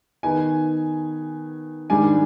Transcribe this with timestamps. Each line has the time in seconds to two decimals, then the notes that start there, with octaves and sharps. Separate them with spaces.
0.23 D#3 B3 D#4 G#5
1.90 G#2 D#3 G3 D4 G#5